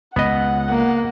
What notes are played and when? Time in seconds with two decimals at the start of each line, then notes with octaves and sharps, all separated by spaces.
0.16 C#2 B3 D#5 F#5
0.70 A#3